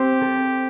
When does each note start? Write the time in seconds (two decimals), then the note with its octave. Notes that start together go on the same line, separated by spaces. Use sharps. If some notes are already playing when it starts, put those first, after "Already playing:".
Already playing: C4 G4 C5
0.21 A4